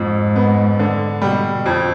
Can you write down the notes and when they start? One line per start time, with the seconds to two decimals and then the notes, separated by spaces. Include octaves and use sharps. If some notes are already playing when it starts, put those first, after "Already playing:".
Already playing: F2 G#2
0.36 B3
0.79 D3
1.22 B2 G3
1.66 F2